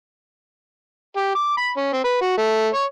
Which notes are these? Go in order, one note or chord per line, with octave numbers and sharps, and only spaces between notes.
G4
D6
B5
C#4
C4
B4
F#4
A3
C#5